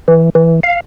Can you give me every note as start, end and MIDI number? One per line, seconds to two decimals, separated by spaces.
0.08 0.30 52
0.35 0.60 52
0.63 0.80 77